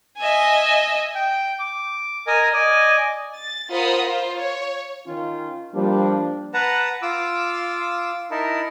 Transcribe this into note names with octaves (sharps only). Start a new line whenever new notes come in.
D#5 E5 G#5
G5
D6
A#4 D#5 G#5 D#6
D5 D#5 G#5
A6
F4 A#4 C5 F#5 B5 D#6
F4 C5
C#5
D#3 C#4 F4
F3 G3 A#3 D4
B4 F#5 A5 A#5
F4 D6 E6
D#4 E4 A#4 A5